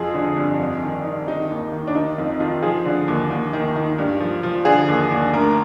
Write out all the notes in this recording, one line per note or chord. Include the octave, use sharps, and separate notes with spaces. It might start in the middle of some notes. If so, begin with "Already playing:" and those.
Already playing: F2 F3 G#4
D3
G2
F2
D#3
D#3
D#3 D#4
D#2
D#3
D4
D#3 D#4
F2
D#3 F4
F3 G#4
D3
D#2
D#2
D#3
D#3
G2
F3
F3
D3 G#4
D#2
D#2
D2 A#4